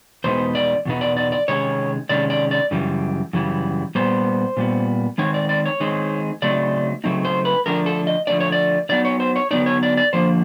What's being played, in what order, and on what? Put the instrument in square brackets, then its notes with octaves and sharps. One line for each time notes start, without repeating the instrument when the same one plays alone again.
[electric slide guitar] E2 B2 G#3 B3 D#4 C5
D5
E2 B2 B3 D#4
D5
D5
D5
C3 D#3 G#3 C#4 C#5
C3 D#3 G#3 C#4 D5
D5
D5
F#2 C#3 E3 G3
F#2 C#3 E3 G3
A#2 G3 B3 C5
A#2 G3 B3
D#3 G#3 C4 D#4 C#5
D5
D5
C#5
D#3 G#3 C4 D#4
C#3 F#3 A3 C4 D#4 D5
C#3 F#3 A3 C4 D#4
C5
B4
D3 F3 A3 D4 A#4
A4
D#5
D3 F3 A3 D4 D5
C#5
D5
D3 F#3 B3 D#4 D5
C#5
C5
C#5
D3 F#3 B3 D#4 D5
C#5
D5
D5
D3 F3 A#3 C5